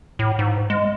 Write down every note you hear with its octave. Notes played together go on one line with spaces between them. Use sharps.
A2
G#2
G#3